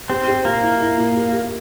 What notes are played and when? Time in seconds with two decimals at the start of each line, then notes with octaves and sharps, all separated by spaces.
0.10 C4 G4
0.27 G4
0.45 A#2 A#3
0.62 E4
0.80 E4
0.98 A#2
1.16 G4
1.32 G4